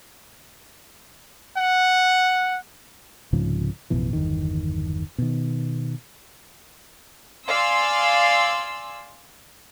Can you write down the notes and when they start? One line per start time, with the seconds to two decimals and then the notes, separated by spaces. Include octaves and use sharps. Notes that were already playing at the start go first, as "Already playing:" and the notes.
1.57 F#5
3.33 C2 G#2 C#3 F3
3.90 A1 F2 B2 E3
4.13 G1 E2 D#3
5.18 B2 D#3
7.47 D5 F5 G#5 C6 E6